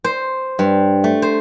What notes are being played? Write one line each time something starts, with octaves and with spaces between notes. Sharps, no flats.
C5
G2
A3
C5